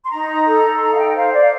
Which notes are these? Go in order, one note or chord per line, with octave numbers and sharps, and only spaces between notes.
C6
D#4 A#5
A4
C6
D#4 A#5
F5
G5
C5 F5
D5
F5